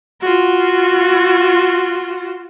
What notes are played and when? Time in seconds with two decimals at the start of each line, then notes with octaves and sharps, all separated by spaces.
0.21 F4 F#4